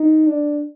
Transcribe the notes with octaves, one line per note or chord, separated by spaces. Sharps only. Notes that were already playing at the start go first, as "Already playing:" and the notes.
Already playing: D#4
D4